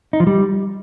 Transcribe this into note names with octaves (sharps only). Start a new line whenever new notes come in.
D#4
F3
G3